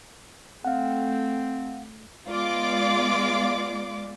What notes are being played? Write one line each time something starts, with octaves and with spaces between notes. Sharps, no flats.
A3 C4 F5 F#5
G#3 B3 F4 D5 D6